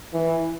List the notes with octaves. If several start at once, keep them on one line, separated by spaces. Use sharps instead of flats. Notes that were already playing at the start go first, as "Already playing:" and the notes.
E3